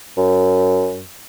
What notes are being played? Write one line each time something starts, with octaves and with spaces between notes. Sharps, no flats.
F#2